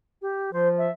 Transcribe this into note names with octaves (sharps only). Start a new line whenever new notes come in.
G4
F3 C5
E5